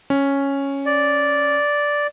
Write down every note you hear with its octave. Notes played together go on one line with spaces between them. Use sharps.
C#4
D5